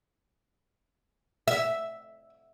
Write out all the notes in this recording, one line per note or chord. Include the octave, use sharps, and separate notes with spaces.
E5